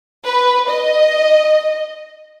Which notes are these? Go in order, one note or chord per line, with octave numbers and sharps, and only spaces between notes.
B4
D#5